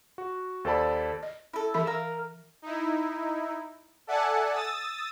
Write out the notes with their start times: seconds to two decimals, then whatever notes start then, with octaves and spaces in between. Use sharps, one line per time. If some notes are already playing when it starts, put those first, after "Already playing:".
0.18 F#4
0.65 D#2 A4 C5 D5 A5 B5
1.23 D#5
1.54 E4 A4
1.74 E3 E5 B5
1.87 A#4 F5 E6
2.62 D#4 E4
4.07 A4 D5 E5 F#5 G#5 A5
4.53 D#6 E6 A6